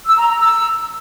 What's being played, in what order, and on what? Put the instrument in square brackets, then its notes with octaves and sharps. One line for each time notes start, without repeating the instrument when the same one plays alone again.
[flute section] E6
A#5
A#5
E6